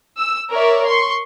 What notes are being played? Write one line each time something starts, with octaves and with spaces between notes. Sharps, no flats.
E6
A#4 C#5 D5 E5
C6 C#6